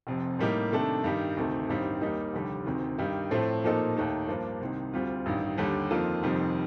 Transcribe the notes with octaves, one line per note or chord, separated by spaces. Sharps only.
F1 F2 C3
A2 G3 A#3 D#4 G4
C3 D#3 A3 D4 A4
G2 D#3 G3
D2 C3 D#3 A3
A1 G2 D#3 G3 C4
D#2 D#3 G3 A#3 D#4
F1 D#2 D3 G3
D2 C3 D#3
G2 D#3 G3
A2 F3 A3 C4
A#2 F3 A#3 D#4 A4
D#2 D#3 A3
G2 F3 A#3 D4
C2 C3 D#3
D2 C3 G3 C4 F4
A1 G2 D#3
D#2 D3 G3
F2 D#3 A#3 F4 A4
F1 F2 D#3 G3